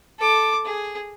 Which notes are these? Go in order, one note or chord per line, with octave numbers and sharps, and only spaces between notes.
A4 D6
G#4